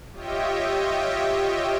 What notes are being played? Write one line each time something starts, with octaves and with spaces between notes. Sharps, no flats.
F4 G4 C#5 D#5 E5 G5